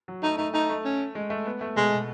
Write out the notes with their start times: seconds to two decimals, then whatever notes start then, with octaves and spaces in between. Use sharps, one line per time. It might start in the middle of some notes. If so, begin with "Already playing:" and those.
0.08 F#3
0.23 A3 D#4
0.38 A3 D#4
0.54 A3 D#4
0.69 A3
0.85 C#4
1.15 G#3
1.30 A3
1.46 B3
1.61 A3
1.76 B2 G#3
1.92 B2